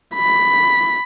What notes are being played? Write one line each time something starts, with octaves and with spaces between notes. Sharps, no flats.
B5